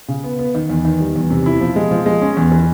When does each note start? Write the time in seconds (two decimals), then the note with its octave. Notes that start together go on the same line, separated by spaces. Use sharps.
0.08 C#3
0.24 B3
0.39 B3
0.55 D#3
0.70 E2
0.85 D#3
1.00 G3
1.16 E2
1.30 C3
1.46 E4
1.61 F3
1.76 G#3
1.91 F3
2.06 G#3
2.22 C#4
2.37 E2
2.52 E3